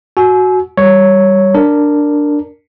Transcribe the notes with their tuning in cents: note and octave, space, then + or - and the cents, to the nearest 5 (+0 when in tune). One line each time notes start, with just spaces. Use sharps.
F#4 +0 G#5 +35 E6 -15
G3 +0 C#5 +0
D4 +0 A#4 -10